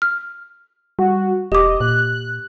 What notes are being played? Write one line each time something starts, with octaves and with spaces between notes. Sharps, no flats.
F6
G3 F#4
E1 G4 D#5 D6
A#2 F#6